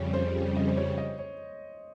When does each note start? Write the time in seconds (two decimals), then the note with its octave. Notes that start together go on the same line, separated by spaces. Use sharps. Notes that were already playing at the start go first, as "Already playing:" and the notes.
Already playing: F2 C#3 G3 C#5
0.14 C5
0.57 D#5
0.68 C5
0.77 C#5
0.98 D#5
1.19 C#5